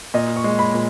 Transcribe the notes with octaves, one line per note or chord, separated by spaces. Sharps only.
A#2 D#5
C#6
G#3
B5
A#2